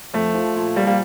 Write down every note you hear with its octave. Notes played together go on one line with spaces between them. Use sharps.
F2 A3
F3
A#2
F3 G3 A#3
G3 A#3